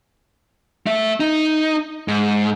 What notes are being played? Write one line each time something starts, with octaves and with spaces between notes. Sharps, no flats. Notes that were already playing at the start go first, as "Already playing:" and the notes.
A3 E5
D#4
G#2